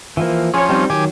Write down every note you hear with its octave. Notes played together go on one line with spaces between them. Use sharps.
E3 F3 A#3
F3 C#4 G#4 C#5
G3 C4 D#4
D#3 F#3 G4 G#5